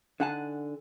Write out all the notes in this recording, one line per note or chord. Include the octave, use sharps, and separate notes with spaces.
D3 D#4 F#5 G#5 A5